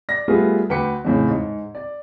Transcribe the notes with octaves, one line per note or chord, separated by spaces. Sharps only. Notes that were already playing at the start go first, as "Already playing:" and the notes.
D5 A#6
G3 A3 B3 F4 G#4 B4
D2 B4 G5 D6 C#7
F2 A2 C#3
G#2
D5